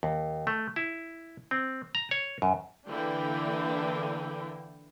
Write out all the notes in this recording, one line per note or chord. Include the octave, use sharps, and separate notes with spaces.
D#2
A3
E4
C4
A#5
C#5
F#2
D3 E3 A#3 D4 E4 G5